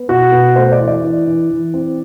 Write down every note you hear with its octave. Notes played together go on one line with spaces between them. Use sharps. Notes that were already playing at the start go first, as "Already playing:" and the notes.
Already playing: B3
B2 F#4
B2
A3 C5
D5
E3
D5
E3
E3
E3
C4